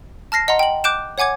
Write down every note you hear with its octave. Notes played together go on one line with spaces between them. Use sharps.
A5 F6 A#6 C7
D#5 F#5 A#5 C6
G5 F#7
D6 F#6 G6 D7 E7
C#5 F#5 G#5 D6 G#6